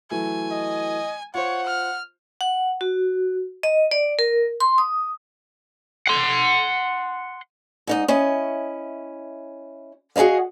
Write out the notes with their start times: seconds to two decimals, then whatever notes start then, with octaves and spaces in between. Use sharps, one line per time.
0.11 E3 F#3 A3 G#5
0.51 D#5
1.35 F4 C5 C#5 F#5
1.67 F6
2.41 F#5
2.81 F#4
3.63 D#5
3.91 D5
4.19 A#4
4.60 C6
4.78 D#6
6.08 F#5 C6
7.87 G#2 D#4 D#5
8.08 C#4 E4 D#5
10.16 F#4 G#4 B4 D#5 F5